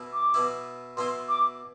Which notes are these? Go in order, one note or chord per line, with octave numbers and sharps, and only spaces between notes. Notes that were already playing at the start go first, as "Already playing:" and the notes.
Already playing: B2 B3 E4
D6
B2 B3 E4
B2 B3 E4 C6
D6